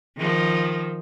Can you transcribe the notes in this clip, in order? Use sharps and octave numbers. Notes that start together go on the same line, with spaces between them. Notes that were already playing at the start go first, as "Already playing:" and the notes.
D#3 F3